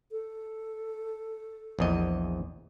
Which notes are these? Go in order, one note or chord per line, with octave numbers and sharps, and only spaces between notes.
A4
A#1 E2 D#5